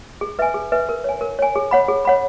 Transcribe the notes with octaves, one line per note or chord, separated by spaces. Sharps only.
G#4
B4 E5 G#5
G#4
B4 E5 G#5
A#4
C#5 G#5
A#4
C#5 G#5
G#4
C#5 F#5 B5
G#4
C#5 F#5 B5